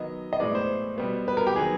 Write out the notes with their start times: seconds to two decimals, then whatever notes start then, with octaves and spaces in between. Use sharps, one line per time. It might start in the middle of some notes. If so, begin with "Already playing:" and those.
Already playing: D#3 F#3 B3 D#5
0.33 D#5
0.40 A2 E3 G#3 B3 D5
0.55 C5
0.98 B2 G3 B3
1.28 B4
1.37 A#4
1.47 G4
1.56 D#3 F#3 B3 G#4